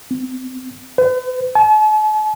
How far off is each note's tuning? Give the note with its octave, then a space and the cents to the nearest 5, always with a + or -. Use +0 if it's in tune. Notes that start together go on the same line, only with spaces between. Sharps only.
C4 -30
B4 +45
A5 -45